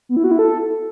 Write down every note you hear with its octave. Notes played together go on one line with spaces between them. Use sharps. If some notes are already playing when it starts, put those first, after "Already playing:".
B3
E4
F#4
E4
A4